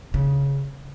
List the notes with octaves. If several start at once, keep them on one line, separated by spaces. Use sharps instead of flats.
C#3